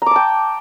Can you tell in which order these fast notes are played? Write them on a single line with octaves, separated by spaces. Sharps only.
A#5 D6 A5 G5